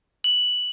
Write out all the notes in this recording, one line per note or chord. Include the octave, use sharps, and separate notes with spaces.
F#7